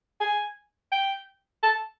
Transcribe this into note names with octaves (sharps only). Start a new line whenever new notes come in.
G#5
G5
A5